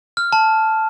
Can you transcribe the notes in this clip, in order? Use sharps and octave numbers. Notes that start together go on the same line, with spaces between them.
F6
A5